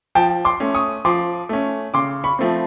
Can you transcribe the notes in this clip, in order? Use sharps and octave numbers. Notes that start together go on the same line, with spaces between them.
F3 G5 A5
C6 D6
A3 C#4
C#6 D#6
F3 C6 D6
A3 C#4
C#3 C6 D6
B5 C#6
F3 A3 C4